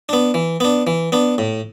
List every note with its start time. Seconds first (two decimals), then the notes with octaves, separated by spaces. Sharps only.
0.09 B3 D4
0.34 E3
0.60 B3 D4
0.87 E3
1.12 B3 D4
1.38 A2